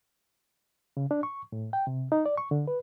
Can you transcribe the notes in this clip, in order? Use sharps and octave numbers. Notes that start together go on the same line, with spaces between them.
C#3
D4
C#6
A2
G5
C3
D#4
D5
C#6
D3
B4